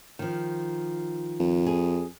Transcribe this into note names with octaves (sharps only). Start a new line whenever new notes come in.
D#3 F3
F2
G#4